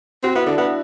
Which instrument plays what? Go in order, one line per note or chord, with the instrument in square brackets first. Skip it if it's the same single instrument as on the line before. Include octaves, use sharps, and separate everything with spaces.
[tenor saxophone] C4 [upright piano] F#4
[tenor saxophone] B3 [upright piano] E4
[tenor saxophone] D3 [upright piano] D4
[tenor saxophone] B3 [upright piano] E4